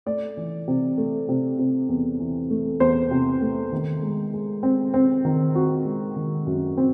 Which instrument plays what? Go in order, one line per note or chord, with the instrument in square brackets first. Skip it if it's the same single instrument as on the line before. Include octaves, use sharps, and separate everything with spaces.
[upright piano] A3 D5
E3
C3
A3
C3
C3
E2
E3
A3
E2 C5
C3
A3
D#3
G#3
G#3
C4
C4
D#3
C4 F#4
G#3
D#3
F#2
C4